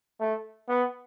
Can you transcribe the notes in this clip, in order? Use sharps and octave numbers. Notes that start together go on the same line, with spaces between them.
A3
B3